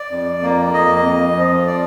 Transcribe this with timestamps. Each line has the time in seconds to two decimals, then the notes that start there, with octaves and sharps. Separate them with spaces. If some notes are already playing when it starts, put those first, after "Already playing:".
Already playing: D5
0.11 F2
0.43 A#3
0.74 F2 D#5
1.05 F2
1.36 F3
1.67 D5